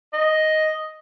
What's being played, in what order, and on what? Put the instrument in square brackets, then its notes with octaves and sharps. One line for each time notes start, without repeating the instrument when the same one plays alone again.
[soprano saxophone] D#5